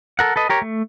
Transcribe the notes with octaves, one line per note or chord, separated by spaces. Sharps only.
A4 A#4 F#5
A4 B4 D#5
G4 A#4 C#5
A3